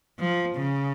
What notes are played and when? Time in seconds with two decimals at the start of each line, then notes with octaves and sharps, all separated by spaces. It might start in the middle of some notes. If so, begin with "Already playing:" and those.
0.19 F3
0.56 C#3